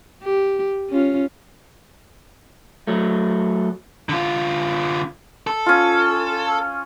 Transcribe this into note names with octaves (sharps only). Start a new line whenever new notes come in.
G4
C#4 F4
F#3 A3
D3 F4
A4
C#4 F4